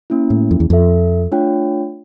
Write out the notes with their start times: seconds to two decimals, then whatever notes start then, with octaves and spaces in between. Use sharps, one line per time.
0.10 A#3 C#4 E4
0.30 A2
0.51 F2
0.60 E2
0.70 F2 F4 A4 E5
1.32 A3 D4 F4 C#5 G5